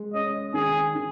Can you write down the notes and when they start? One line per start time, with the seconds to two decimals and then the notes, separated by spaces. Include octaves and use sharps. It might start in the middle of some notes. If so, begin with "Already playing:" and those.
Already playing: G#3
0.14 C#4 D#5
0.54 D#3 G#4
0.95 D#3